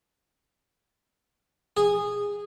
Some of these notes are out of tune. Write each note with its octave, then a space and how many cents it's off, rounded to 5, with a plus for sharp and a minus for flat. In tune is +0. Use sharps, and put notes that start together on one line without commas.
G#4 -15